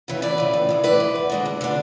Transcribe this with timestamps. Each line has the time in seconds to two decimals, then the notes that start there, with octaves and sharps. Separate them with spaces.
0.08 C#3 E3
0.22 E2 B4 D5
0.38 C#3 E3
0.53 A2
0.69 E3 G#3
0.84 A2 B4 D5
1.00 E3 G#3
1.15 E2
1.30 D3 G#3 D4
1.46 E2
1.61 D3 G#3 D4